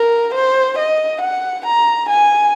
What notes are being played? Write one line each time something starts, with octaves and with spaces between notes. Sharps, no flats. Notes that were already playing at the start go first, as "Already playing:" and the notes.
Already playing: A#4
C5
D#5
F#5
A#5
G#5